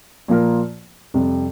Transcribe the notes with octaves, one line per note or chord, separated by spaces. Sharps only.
A#2 F3 A#3 F4 A#4
F2 C3 G3